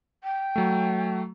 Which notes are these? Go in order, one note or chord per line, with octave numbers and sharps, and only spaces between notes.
G5
F#3 A3